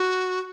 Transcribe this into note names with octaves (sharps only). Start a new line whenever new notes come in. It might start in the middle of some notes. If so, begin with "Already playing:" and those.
Already playing: F#4